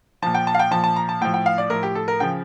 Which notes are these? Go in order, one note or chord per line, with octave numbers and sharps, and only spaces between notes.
A#2 F3 A5
G5
A5
F5
G5
A#2 F3 A5
A5
A#5
A5
A2 F3 G5
G5
F5
D5
A2 F3 A#4
G4
A4
A#4
C#3 F3 G5